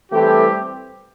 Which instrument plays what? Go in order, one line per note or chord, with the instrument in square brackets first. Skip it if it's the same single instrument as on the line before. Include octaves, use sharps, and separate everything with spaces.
[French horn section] E3 A3 [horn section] G3 C4 G4